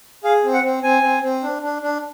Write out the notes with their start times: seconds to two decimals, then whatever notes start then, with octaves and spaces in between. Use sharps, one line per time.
0.24 G#4 F5
0.44 C4
0.53 F#5
0.64 C4
0.83 C4 G#5
1.03 C4
1.23 C4
1.43 D4
1.62 D4
1.82 D4